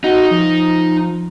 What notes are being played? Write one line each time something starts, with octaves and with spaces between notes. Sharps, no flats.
D#4 F#4
F3